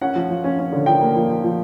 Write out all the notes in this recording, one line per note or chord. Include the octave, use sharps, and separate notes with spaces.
C#4 F#5
F3
F3
C#4
C#4
D3
F3 G5
A#3
F3
F3
F3